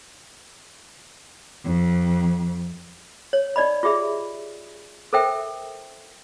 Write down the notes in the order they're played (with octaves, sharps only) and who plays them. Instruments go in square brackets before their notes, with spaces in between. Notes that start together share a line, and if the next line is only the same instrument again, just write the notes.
[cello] F2
[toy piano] C#5
D#4 D5 D#5 B5
F4 G4 G#4 E5 B5
A4 A#4 C5 E5 G5